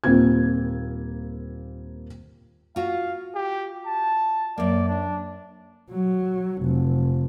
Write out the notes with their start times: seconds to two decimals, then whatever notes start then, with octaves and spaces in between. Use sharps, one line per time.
0.04 D#1 A#3 C4 F4 G#6
2.76 F4 F#4 F5
3.35 G4
3.86 A5
4.58 F#2 A#3 D5
4.88 D4
5.90 F#3
6.63 F1